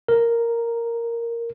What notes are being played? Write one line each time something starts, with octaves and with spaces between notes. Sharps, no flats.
A#4